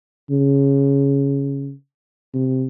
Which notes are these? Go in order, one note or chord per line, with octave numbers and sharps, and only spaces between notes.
C#3
C3